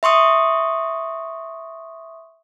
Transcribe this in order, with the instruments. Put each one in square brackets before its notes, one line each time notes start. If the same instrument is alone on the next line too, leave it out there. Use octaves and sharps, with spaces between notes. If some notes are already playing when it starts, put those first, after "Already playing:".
[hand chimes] E5 C6 C#6 D#6